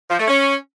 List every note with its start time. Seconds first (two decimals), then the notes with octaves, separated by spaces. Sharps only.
0.09 F3
0.19 A3
0.28 C#4